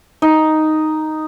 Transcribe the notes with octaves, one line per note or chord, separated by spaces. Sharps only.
D#4